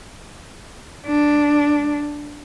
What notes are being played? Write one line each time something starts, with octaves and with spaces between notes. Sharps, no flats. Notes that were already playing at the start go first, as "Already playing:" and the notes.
D4